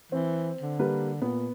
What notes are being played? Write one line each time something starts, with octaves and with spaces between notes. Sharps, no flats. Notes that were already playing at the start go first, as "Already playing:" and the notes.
E3 C4
D3
G3 A#3 B4
A#2 B3